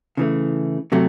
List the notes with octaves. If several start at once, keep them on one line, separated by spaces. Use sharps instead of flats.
C#3 E3 A3
C3 F#3 A3